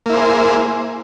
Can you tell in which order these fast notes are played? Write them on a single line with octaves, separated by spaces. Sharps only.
A#3 E4 C5 G#4